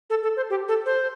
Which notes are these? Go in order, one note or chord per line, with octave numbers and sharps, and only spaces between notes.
A4
A4
C5
G4
A4
C5